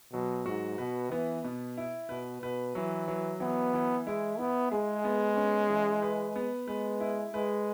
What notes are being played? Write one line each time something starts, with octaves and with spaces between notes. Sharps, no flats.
B2 F#3
G#2 F#4
B2 B4
E3 B3
B2
E4
B2 B4
B2 B4
E3 F#3
F#3
E3 B3
E3
G#3 E4
B3 E4
G#3 G#4
B3
C#4
E3
B4
B3
G#3 B4
E4
G#3 B4